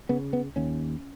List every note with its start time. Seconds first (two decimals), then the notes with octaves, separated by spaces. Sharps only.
0.09 C#3 B3
0.33 B3
0.56 D#2 C#4